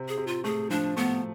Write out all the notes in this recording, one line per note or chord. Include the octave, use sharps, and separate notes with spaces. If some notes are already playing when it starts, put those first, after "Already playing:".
Already playing: C3
G#4
C3
F4
A3 G#4
F3 D4
A3 B3